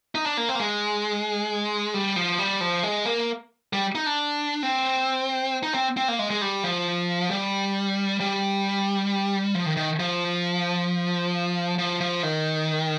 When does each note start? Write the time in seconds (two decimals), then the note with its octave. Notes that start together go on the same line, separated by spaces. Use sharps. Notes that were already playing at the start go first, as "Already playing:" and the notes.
0.15 D#4
0.26 D4
0.37 A#3
0.49 C4
0.55 A#3
0.59 G#3
1.94 G3
2.16 F3
2.39 G3
2.61 F3
2.83 G#3
3.05 A#3
3.73 G3
3.95 D#4
4.06 D4
4.63 C4
5.63 D#4
5.74 C4
5.97 C4
6.08 A#3
6.19 G#3
6.30 G#3
6.42 G3
6.64 F3
7.31 G3
8.20 G3
9.55 F3
9.66 D#3
9.77 D#3
10.00 F3
11.78 F3
12.01 F3
12.23 D#3